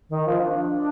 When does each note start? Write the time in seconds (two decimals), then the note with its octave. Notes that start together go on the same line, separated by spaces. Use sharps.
0.09 D#3
0.25 F3
0.41 D4